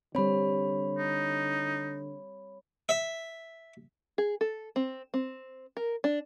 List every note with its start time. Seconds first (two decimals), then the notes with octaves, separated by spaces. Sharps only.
0.15 D3 G3 C4 C#5 B5
0.98 D#4
2.89 E5
4.18 G#4
4.41 A4
4.76 C4
5.14 C4
5.77 A#4
6.04 D4